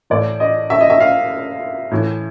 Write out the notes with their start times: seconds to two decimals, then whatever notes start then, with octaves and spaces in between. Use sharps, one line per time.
0.10 A2 E3 D5
0.40 D#5
0.70 E5
0.81 D#5
0.90 E5
1.00 F5
1.91 A2 E3